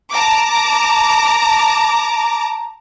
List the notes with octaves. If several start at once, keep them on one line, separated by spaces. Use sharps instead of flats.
A5 A#5 D6